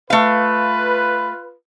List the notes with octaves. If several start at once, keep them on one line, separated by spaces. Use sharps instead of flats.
A3 F4 B4 F5